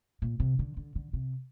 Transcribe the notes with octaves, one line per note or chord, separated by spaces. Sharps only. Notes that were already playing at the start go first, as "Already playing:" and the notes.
A#2
C3
D3
D3
D3
C3